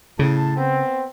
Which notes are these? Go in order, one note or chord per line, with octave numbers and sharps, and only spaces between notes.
A2 C#3 C#4 A5
B3 C4